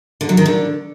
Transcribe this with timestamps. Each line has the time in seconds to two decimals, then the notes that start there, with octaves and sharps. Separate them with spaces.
0.21 D3
0.29 F#3
0.37 D#3
0.46 D3